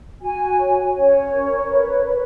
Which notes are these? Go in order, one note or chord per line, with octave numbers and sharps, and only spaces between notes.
F#4 G#5
C#5
C#4 C#5
A#4
B4
B4